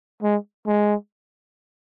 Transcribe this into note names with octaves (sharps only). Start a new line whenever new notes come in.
G#3
G#3